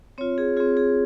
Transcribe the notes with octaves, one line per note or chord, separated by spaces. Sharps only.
C4 F4 C#5
G#4
C4 F4 G#4
G#4